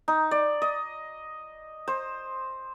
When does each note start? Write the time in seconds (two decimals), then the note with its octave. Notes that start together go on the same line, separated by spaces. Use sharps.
0.08 D#4
0.31 D5
0.62 D#5
1.88 C5